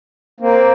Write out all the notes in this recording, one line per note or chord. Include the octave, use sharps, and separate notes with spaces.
A#3 C4